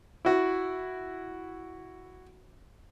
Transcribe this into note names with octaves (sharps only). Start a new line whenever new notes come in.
E4 F#4